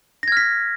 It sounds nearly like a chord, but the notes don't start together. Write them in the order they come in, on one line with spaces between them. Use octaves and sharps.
A#6 G#6 F6 B6